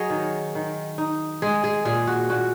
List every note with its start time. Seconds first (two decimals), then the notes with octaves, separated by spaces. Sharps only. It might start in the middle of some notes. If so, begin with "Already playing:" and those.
Already playing: F#3 G#4 C#5 D#5
0.10 D#3
0.55 D#3
0.98 D#4
1.42 G#3 G#4
1.64 G#4
1.85 A#2 G#4
2.07 F#4
2.30 A#2 F#4